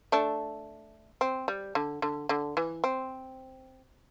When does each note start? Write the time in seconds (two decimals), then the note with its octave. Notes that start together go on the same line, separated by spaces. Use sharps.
0.12 A3 D4
1.21 C4
1.48 G3
1.75 D3
2.02 D3
2.29 D3
2.57 E3
2.84 C4